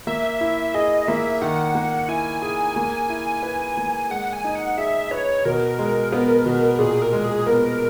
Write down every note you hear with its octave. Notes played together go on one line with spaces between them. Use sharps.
A#3 E5
E4
G#4 D#5
A#3 E5
D#3 F#5
A#3
E4 G#5
G#4 G#5
A#3
E4
B4
A#3
G#3 F#5
G#5
D#4
F#5
G#4 E5
B4 C#5
B2 A#4
G#3
B3
B2
A#2 G#4
A#4
G#3
G#4
B3 A#4